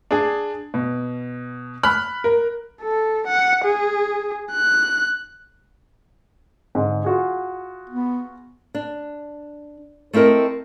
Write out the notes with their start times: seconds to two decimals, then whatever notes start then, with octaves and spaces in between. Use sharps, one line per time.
0.11 D4 G#4
0.74 B2
1.83 B5 F6 F#6
2.24 A#4
2.82 A4
3.27 F#5
3.64 G#4
4.52 F#6
6.75 G#2 D3
7.04 F4 F#4 G#4
7.89 B3
8.74 D4
10.13 A3 C4 E4 A#4 D#5